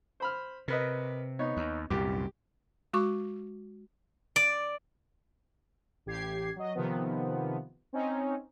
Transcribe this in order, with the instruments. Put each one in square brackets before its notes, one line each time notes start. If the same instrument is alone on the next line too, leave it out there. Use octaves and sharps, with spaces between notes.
[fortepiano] C5 B5 F6
[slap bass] C3 [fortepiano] A#4 B4 D#5
[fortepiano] B3 D#4 C#5
[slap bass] D#2
[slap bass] C2 F#2 A#2 [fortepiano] G4
[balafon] G#3 F#4 C#6 D6
[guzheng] D5
[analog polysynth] A1 G4 G#6 C7
F#3 D#5
C3 D#3 F3 B3
C4 C#4 D#4